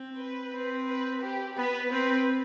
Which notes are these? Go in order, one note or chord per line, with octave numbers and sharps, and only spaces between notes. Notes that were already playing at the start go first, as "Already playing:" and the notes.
Already playing: C4
B4
C4
B4
G4
B3 B4
C4 B4